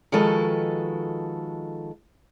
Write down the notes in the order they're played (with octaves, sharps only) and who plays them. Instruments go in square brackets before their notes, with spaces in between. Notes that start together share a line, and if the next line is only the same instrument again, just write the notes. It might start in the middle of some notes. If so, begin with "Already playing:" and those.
[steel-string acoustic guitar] D#3 F3 G#3 F#4 A4 B4